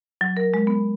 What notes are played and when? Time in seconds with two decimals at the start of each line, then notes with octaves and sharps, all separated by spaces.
0.21 F#3
0.37 A#4
0.54 G#3
0.67 B3